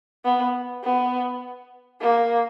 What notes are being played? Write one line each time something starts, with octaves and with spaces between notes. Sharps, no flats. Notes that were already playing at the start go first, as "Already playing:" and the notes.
B3
B3
A#3